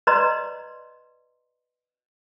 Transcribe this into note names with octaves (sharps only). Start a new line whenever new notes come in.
B4 D5 D#5 A#5 C6